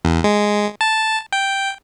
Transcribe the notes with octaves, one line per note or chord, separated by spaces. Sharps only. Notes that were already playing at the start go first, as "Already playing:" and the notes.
E2
G#3
A5
G5